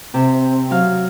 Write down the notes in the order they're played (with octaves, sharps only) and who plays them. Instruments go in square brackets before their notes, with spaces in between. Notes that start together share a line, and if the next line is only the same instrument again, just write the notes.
[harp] C3 [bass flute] C4
[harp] F#3 F5